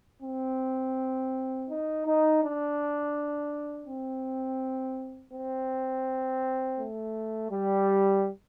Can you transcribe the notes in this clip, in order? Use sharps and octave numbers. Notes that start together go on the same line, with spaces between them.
C4
D#4
D#4
D4
C4
C4
A3
G3